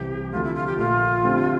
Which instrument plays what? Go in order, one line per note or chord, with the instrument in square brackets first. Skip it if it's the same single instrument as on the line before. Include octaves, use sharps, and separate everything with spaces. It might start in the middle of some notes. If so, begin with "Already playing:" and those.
Already playing: [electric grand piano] C2 C3 E3 [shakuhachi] G4
[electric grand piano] D2 C3 F3 A3 [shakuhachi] F4
[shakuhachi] E4
F4
G4
[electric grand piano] A#1 A#2 A3 [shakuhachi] F4
[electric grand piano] D3 A3 C4 G4